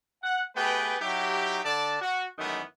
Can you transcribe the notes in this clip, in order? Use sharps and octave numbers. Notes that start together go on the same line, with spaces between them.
F#5
A3 B3 G4 G#4 B4 G5
F#3 D#4 E4 G4
D3 D5 A5
F#4
F#2 D#3 E3 G#3 A3 B3